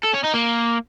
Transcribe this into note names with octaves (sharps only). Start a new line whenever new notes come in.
A4
C#4
D#4
A#3